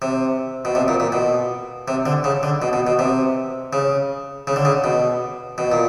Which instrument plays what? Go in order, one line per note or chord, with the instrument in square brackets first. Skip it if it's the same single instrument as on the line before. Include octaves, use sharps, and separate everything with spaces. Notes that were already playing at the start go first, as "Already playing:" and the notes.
[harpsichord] C3
B2
C3
A#2
A#2
B2
C3
D3
C#3
D3
B2
B2
B2
C3
C#3
C#3
D3
C#3
B2
B2
A#2